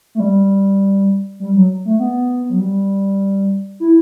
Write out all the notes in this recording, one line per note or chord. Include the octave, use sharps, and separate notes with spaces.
A3
G3
G3
F#3
A3
B3
F#3
G3
E4